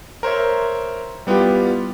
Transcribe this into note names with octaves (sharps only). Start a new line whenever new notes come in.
A#4 C5 C#5 E5
G3 B3 E4 F4 G4